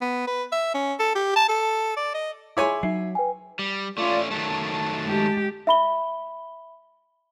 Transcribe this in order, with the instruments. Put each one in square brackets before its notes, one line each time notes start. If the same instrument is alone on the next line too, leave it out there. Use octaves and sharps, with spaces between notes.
[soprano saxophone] B3
B4
E5
C#4
A4
G4
A5
A4
D5
D#5
[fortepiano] E4 C#5 G#5 [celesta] G#4 C6 D6
[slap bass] F#3 [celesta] D#4 E5 C7
[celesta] B4 G5 G#5
[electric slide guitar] G3
[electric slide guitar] A3 C#4 [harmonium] F4 D5
[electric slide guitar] D#3 F#3 A3 [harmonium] A5
[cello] G#3 G4
[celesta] E5 B5 G7